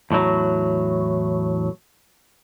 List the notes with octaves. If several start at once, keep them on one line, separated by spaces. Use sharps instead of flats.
E2 A2 D3 F#3